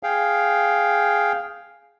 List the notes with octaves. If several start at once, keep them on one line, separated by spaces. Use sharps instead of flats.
G#4 F5 G5